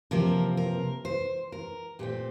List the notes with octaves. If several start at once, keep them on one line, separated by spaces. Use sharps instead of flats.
C3 F3 A#3 A#4
A#4
C5
A#4
A#2 A3 C4 G4